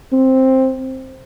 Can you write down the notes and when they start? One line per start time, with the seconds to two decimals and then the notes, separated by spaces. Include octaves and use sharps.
0.12 C4